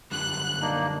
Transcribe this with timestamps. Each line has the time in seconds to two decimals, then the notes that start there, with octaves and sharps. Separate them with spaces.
0.12 F#2 D3 G3 F#6
0.61 A#3 D4 D#4